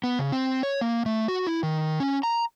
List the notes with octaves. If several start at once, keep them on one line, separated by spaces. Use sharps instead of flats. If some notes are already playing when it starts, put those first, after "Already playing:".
B3
C#3
C4
C#5
A#3
A3
F#4
E4
D#3
C#4
A#5